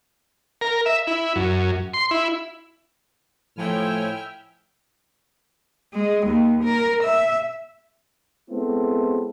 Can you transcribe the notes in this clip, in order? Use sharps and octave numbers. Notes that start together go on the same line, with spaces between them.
A#4
E5
E4
F#2
C6
E4
A2 F3 E4 C#5 E5 G5 G#5 F6
G#3
D#2
A#4
E5
G#3 B3 C4 E4 A4